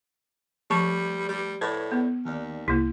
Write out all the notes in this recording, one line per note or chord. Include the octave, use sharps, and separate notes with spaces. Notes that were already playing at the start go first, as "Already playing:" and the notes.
F3 G3 A3 A5 C#6
G3
A2 B4 D5 G#6
B3
D#2 D#3 D5
C2 A#3 E4